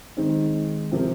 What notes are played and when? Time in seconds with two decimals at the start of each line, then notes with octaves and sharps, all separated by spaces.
0.17 D#3 G#3 C4 D#4
0.91 C3 F3 C4 G4 A#4